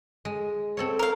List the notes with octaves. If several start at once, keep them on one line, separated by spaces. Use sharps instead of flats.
G#3
C4 A4 C#5
A#4 F5